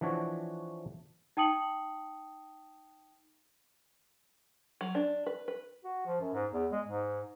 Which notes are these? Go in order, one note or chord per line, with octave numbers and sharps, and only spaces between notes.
E3 F3 D4 F#4 C#5
D#4 G5 A5 D#6 C#7 F#7
F#3
D4
B4
B4
F#4
F3
F#2
G#2
E2
G#3
G#2